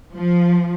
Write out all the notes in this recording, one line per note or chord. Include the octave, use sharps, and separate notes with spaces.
F3